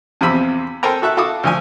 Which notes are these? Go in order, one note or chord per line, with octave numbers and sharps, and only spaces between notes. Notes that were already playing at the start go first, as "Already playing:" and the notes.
E2 C3 F3 C4 B5 E6
A4 A#4 C5 G5 G#5 A#5
F#4 A4 E5 F#6
F#4 A4 F5 A5 D6 D#6
D2 F3 G#5